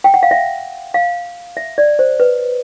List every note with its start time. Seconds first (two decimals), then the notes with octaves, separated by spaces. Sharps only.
0.04 G5
0.14 F#5
0.23 F5
0.31 E5
0.94 F5
1.57 E5
1.78 D5
1.99 C5
2.20 B4